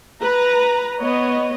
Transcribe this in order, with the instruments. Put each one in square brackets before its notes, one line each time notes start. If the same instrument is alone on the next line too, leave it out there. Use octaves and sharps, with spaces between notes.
[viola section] B4 A#5
B3 C#5 D#5